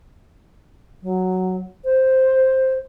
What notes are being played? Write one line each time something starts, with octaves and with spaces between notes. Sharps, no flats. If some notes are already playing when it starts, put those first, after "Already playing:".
F#3
C5